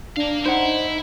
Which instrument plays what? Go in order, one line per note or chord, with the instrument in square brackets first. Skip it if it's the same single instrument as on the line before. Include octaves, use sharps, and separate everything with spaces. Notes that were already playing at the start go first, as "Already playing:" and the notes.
[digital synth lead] D4 [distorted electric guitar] A#4 F5
[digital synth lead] D#4 [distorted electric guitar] E4 [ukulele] C5 F#5